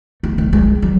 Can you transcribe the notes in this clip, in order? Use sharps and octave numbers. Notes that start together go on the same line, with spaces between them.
A3
A3
G#3
F#3